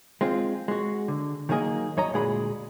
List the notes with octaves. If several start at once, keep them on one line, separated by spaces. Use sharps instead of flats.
G#3 C4 F4
G#3 F#4
D3
D#3 F#3 A#3 G#4 D#5
F#2 C#5 D#5 A#5
D2 A#2 G#3 G#4 D5 B5